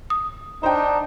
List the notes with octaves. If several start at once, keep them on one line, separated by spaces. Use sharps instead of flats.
D#6
D4 D#4 C5 G5